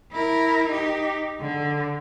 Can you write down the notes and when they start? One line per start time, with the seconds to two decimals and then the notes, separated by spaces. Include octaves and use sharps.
0.12 E4 A#4
0.68 D#4 G4
1.40 D3